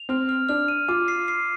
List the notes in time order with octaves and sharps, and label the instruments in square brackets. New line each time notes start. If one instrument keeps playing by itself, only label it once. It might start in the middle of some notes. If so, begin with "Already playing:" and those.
Already playing: [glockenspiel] F7
[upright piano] C4 [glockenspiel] F6
[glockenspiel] F6
[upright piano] D4 [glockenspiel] F6
[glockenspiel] D#7
[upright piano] F4 [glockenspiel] D6
[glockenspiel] C7
C7